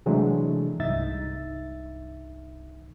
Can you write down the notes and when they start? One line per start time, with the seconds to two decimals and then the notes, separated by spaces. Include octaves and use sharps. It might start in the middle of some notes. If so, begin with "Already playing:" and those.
0.06 C3 E3 F#3 G#3 A3 D4
0.79 C2 G2 D#4 E5 A6